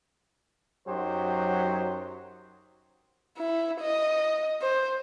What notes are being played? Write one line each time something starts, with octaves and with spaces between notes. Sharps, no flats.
F#2 F#3 D#4 G4 C5
E4
D#5
C5